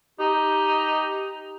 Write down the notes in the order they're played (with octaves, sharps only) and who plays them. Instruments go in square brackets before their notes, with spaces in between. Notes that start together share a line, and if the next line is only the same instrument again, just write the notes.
[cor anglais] D#4 [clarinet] G4